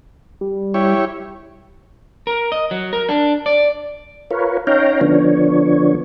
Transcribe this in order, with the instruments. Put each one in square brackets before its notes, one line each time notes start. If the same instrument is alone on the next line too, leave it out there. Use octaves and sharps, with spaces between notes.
[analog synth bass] G3
[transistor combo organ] E4 G4 C#5
[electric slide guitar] A#4
D#5
F#3
A#4
D4
D5
[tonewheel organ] F4 A#4 B4 C#5
C#4 D#4 C#5 F5 G5 A#5
D3 F3 B3 D4 C#5